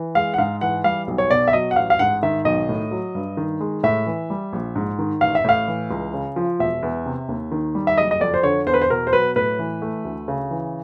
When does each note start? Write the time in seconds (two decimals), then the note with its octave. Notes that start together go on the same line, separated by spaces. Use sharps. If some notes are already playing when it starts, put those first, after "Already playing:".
Already playing: E3
0.15 G#3 F5
0.34 F#5
0.38 G#2 F5
0.61 E3 F#5
0.84 G3 F5
1.08 B1
1.18 C#5
1.31 B2 D5
1.48 E5
1.53 F#3 D#5
1.71 F#5
1.76 A1 F5
1.90 F5
1.99 G#2 F#5
2.23 D#3 E5
2.45 B1 D#5
2.69 A2
2.91 F#3
3.15 G2
3.37 D#3
3.60 G#3
3.83 A2 E5
4.06 E3
4.30 G3
4.53 A#1
4.76 G#2
4.99 D#3
5.21 A1 F5
5.35 E5
5.45 A2 F5
5.68 E3
5.91 C#2
6.14 C#3
6.36 F3
6.60 E1 E5
6.83 E2
7.06 C3
7.29 D#2
7.51 D#3
7.75 G3
7.87 E5
7.98 F#1 D#5
8.11 D#5
8.21 F2 D5
8.34 C5
8.43 D3 C#5
8.67 E2 C5
8.74 B4
8.82 C5
8.90 B2 A#4
9.07 C5
9.13 F#3 B4
9.36 A2 B4
9.59 E3
9.82 A3
10.05 D2
10.28 C#3
10.51 E3